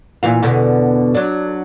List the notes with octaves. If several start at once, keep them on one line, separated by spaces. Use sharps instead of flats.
A#2 E3 F5
E2 B2 D3
F#3 D4